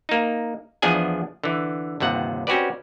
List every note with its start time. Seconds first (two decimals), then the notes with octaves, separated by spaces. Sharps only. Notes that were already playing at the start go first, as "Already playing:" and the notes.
0.09 A#3 D#4
0.82 E2 F3 B3 D4 G#4 G#5
1.44 D3 E3
2.00 G1 D#2 C3 F#5
2.47 C4 C#4 F#4 G4 B4 D5